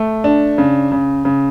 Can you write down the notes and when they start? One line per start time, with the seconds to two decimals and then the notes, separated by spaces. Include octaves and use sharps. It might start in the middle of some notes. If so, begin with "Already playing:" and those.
Already playing: A3
0.24 D4
0.58 C#3
0.92 C#3
1.25 C#3